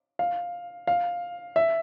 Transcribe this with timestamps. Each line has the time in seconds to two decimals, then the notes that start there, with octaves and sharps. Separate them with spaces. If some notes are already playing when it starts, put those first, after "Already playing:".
0.19 F5
0.87 F5
1.56 E5